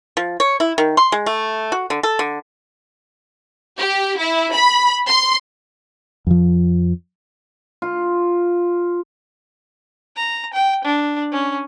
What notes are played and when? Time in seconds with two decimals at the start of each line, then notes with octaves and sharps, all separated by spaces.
0.17 F3
0.40 C#5
0.60 E4
0.78 D#3
0.97 C6
1.12 G#3
1.26 A3
1.72 F#4
1.90 D3
2.03 A4
2.19 D3
3.79 G4
4.19 E4
4.55 B5
5.08 C6
6.27 F2 F3
7.82 F4
10.16 A#5
10.53 G5
10.84 D4
11.32 C#4